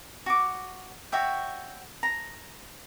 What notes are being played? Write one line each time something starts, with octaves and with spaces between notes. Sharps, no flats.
F#4 D6
F#4 C#5 E5 G5
A#5